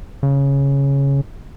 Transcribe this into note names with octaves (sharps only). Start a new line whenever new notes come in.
C#3